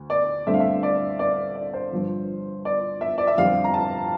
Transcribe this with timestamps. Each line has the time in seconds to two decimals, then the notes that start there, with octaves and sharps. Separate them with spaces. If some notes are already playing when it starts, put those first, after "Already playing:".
Already playing: D2
0.10 D5
0.47 G2 D3 A3 C4 E5
0.54 F5
0.60 E5
0.83 D5
1.19 D5
1.56 D5
1.74 C5
1.92 G1 G2 F3
2.65 D5
3.01 E5
3.18 D5
3.27 E5
3.38 F2 D3 G3 C4 F5
3.64 A#5
3.74 A5